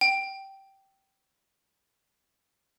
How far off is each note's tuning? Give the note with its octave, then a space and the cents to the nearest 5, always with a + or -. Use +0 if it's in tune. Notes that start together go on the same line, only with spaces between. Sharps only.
G5 -10